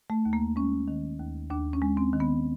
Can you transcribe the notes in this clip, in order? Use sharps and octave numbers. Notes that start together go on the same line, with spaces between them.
A3
D#2
A#3
G#3 C#4
D#3
D#2
D#2 D4
C#4
G#3
C4
D#3
B3